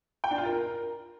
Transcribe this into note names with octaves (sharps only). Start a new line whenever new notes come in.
G5
D4
F4
A#4